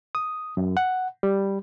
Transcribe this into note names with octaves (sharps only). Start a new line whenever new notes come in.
D#6
F#2
F#5
G3